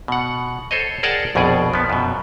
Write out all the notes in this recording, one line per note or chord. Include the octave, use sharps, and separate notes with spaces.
B2 F#5
A4 C5 C#5 D#5
G#4 A#4 D5 F#5 G5 A5
A#1 F2 B2 G#4 D5
F3 B3
F#2 B2